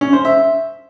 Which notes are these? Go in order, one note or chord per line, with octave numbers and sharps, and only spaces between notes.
C#4
C5
E5